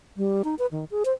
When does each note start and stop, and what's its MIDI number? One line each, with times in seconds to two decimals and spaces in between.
0.17 0.42 55
0.44 0.55 63
0.59 0.66 71
0.71 0.85 51
0.91 1.03 68
1.05 1.13 72